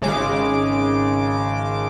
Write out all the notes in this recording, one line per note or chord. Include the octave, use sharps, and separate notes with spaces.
G#1 C#3 G#3 D6